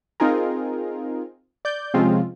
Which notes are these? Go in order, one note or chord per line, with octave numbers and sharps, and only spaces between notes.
C4 D#4 F4 G#4 A#4
D5 G6
C3 F3 G#3 C4 C#4 F4